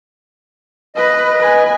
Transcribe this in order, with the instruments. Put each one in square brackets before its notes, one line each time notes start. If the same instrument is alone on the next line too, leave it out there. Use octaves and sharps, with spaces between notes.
[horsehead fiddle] B4 [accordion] D#5
[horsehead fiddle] B4 G#5